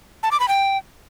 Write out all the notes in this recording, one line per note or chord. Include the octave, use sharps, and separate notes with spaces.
A5
D6
B5
G5